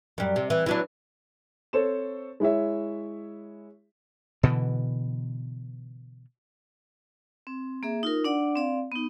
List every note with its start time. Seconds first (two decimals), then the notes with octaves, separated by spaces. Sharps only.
0.18 F#2 G3
0.36 C3
0.50 E3
0.66 E3 F#3 D4
1.73 C4 A4 C5 C#5 E7
2.40 G#3 E4 C#5 E5
4.43 B2 D3 E3
7.47 C4
7.83 A#3 G#4 E5
8.03 D#4 F4 A#4
8.24 D4 D5 F#5
8.55 C4 D5 F5
8.92 B3 D#4